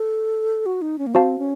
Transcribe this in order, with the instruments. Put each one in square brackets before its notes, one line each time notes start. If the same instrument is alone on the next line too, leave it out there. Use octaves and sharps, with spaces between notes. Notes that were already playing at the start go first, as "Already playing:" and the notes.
Already playing: [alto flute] A4
F#4
D#4
C#4
A#3
[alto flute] C4 [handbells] F#4 C5 F5 A5
[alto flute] C#4